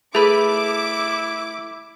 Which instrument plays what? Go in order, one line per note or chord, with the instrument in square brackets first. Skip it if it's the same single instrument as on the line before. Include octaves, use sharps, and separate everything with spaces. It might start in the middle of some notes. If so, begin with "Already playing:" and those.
[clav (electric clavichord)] A3 B4 [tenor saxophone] E4 [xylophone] G#4 B5 [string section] D6